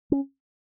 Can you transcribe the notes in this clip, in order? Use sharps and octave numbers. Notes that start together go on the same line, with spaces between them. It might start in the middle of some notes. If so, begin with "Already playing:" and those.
C#4